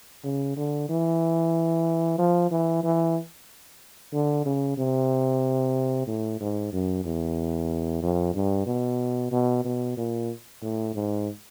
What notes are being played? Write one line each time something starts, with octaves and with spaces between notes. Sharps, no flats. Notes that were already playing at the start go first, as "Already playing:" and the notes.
C#3
D3
E3
F3
E3
E3
D3
C#3
C3
A2
G#2
F#2
E2
F2
G2
B2
B2
B2
A#2
A2
G#2